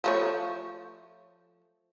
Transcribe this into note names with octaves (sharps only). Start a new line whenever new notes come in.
F3 A3 C#5